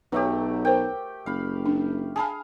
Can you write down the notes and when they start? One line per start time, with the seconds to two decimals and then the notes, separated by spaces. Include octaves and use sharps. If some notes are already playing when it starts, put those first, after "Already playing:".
0.12 B1 F#3 A3 G4 B4 C#5
0.65 A#4 C5 G5
1.26 F#1 F5 B5
1.66 D4
2.16 G#4 F5 G#5 A5 B5